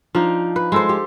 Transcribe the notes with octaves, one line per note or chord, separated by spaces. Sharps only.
F3 D4 D#4
B4
G#3 A4 C5
G4